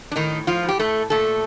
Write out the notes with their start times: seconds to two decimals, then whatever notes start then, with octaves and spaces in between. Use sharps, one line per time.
0.12 D4
0.16 A2 D#3 D#4
0.47 F3 F4
0.63 A2
0.69 G4
0.79 A3 A4
1.10 A#2 A3 A4